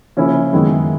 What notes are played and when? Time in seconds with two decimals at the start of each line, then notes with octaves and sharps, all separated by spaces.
0.17 C#3 F3 A#3 C#4 E4
0.52 F#2 D#3 G#3 B3 E4